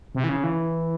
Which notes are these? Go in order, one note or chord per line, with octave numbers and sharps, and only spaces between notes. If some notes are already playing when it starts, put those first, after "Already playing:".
C3
E3
C#3
E3